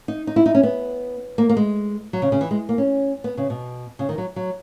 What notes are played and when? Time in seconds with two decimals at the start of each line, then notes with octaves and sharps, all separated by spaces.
0.08 D#4
0.27 D#4
0.36 E4
0.46 D#4
0.55 C#4
0.63 B3
1.38 A#3
1.49 A#3
1.57 G#3
2.13 F#3
2.22 C#3
2.32 C#3
2.41 E3
2.51 G#3
2.69 A#3
2.78 C#4
3.24 B3
3.37 C#3
3.50 B2
3.99 C#3
4.09 D#3
4.18 F#3
4.36 F#3